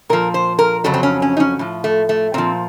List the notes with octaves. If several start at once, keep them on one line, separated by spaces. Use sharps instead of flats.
A#2 F3 A#4
C5
A#4
F2 C#3 F#3 A4
C4
C#4
C#4
D#4
C#4
A2 F3
A3
A3
A#2 F3 C4